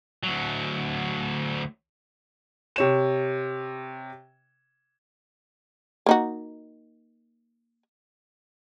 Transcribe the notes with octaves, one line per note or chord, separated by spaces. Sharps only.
D2 F#3
C3 C#5 E7
A#3 D#4 F#4